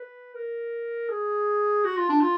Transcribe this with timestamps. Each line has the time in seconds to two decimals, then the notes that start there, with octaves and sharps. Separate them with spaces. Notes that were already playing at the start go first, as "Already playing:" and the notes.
Already playing: B4
0.35 A#4
1.09 G#4
1.84 F#4
1.97 F4
2.09 D4
2.21 F4